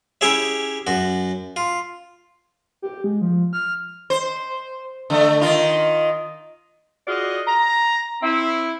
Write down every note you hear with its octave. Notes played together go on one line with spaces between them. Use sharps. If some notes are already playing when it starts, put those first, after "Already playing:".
C#4 E4 G4 G#4 C#5 E5
F#2 F#4
F4
G4
G#3
F3
F6
C5
D3 A3
D#3 D#4 F4
F4 F#4 G#4 D5 D#5
A#5
C4 E4